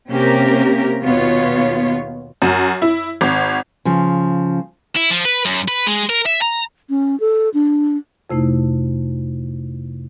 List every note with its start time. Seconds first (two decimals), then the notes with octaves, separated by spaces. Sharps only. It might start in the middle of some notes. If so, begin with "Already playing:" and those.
0.10 C3 A#3 C#4 G4 A#4
1.04 D#2 B2 B3 F4 C#5
2.42 F#2
2.82 E4
3.21 G#1
3.85 C#3 F3
4.96 E4
5.10 F3
5.25 B4
5.45 F#2
5.68 B4
5.87 G#3
6.09 A#4
6.26 E5
6.42 A#5
6.90 C#4
7.20 A4
7.54 D4
8.30 F2 C3 A3 D#4 E4